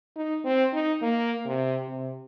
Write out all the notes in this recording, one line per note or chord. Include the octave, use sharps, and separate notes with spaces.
D#4
C4
D#4
A#3
C3
C3